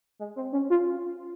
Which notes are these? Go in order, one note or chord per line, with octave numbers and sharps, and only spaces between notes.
G#3
C4
C#4
F4